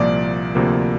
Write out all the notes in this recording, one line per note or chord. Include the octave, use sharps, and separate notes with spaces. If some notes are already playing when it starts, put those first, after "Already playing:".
Already playing: C2 A#2 F3 A#3 D5
D2 C3 F3 A#3